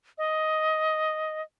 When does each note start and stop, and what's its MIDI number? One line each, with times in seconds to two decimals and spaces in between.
0.18 1.42 75